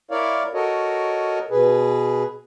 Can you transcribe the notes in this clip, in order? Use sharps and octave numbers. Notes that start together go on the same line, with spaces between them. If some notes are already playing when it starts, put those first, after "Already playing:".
E4 A#4 C#5 D5 F5
F#4 A4 A#4 C#5 D#5
B2 G#4 B4